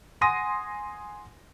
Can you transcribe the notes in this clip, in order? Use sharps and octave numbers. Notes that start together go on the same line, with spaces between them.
F#5 G#5 C6 D#6 A#6 D#7